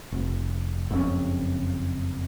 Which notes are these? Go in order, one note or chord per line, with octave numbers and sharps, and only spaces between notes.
F1
F#1 F2 C#4